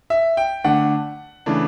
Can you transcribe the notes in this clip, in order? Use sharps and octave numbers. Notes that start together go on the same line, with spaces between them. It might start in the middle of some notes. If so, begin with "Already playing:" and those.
E5
G5
D3 A3 D4 F#5
C#3 E3 A3 D4